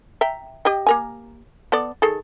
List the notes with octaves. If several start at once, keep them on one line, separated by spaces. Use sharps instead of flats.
E5 G5 A#5
G4 D#5 G5
A#3 A#4 G#5
B3 A4 D5
D#3 G#4 A4